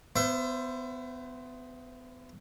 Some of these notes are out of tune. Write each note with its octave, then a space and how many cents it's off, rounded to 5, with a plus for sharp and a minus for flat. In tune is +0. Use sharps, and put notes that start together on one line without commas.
B3 +30 C5 +0 E5 +35